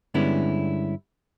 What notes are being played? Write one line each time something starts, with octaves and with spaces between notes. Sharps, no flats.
G2 D3 G#3 B3 C#4 E4